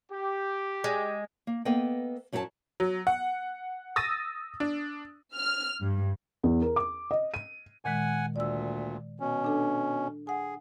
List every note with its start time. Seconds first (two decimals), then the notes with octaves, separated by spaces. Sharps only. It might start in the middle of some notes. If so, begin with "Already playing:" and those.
0.10 G4
0.84 G#3
1.47 A#3
1.65 A#3 B3 A4 B4 D#5 G5
2.32 F#2 F#3 D4 F#4 E5 A5
2.80 F#3
3.07 F#5
3.96 D#6 E6 A6 A#6 D#7
4.60 D4
5.36 F6
5.81 G2
6.44 E2
6.62 A#4
6.76 D6
7.11 D#5
7.34 D#7
7.85 A#2 D#3 G#3 F#5 G#5
8.36 D2 A#2 D5 E6
9.20 B2 C#4
9.44 D4 A4
10.27 G#4 F#5 G#5